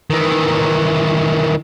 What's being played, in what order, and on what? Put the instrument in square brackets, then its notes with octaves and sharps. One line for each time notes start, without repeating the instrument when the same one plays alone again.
[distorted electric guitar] D#3 E3